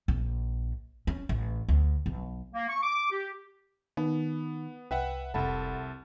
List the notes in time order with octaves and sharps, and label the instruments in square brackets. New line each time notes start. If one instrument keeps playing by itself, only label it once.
[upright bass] A#1
C#4
A1
D2
B1
[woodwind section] A#3
C#6
D6
G4
[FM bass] D#3 [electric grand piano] B3 [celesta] D#4
[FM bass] C2 [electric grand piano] B4 E5 F#5 [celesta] G5
[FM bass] F1 [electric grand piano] C2 E5 A5 [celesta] A4 F#5 B5